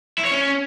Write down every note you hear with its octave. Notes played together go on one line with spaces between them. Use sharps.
E4
C#5
C#4